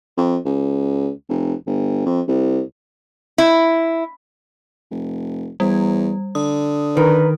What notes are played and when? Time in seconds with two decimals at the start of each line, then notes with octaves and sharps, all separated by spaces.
0.17 F2
0.45 C#2
1.29 F1
1.66 G1
2.06 F2
2.28 C2
3.38 E4
4.91 F1
5.60 E2 G3
6.35 D3 D#6
6.97 D#3 A#4 B4